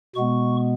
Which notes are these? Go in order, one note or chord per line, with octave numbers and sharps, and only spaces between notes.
B2 G#3 B3 C#6